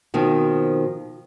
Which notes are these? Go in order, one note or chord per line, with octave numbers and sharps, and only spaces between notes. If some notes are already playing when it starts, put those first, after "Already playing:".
B2 D#3 F3 C4